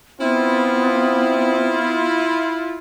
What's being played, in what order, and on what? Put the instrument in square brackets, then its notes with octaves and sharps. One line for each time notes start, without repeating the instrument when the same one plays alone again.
[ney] B3 [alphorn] C4 [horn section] E4 F4